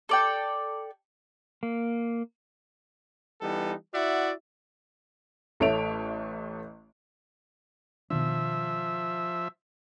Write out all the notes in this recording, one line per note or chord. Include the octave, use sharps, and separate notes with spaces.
A4 D5 G5
A#3
E3 G3 B3 D#4 A4
E4 F#4 D5 E5 F#5
A1 A3 C#5 E5 D7 F7
B2 D#3 F3 D4 E5